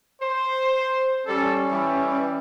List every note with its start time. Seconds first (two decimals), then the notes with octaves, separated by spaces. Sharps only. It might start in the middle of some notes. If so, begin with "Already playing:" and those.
0.22 C5
1.27 G3 C#4 A4
1.70 E3 G3